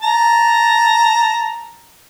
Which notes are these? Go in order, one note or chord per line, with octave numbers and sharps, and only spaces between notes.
A5 A#5